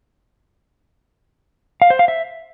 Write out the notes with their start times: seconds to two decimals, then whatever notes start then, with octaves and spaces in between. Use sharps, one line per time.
1.82 F5
1.90 C5
1.99 F5
2.08 E5